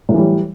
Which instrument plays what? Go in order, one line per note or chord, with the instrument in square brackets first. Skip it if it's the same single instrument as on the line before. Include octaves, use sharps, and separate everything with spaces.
[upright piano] A2
F#3
E3
G3